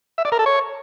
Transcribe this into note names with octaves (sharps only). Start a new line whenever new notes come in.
E5
D5
A#4
A4
C#5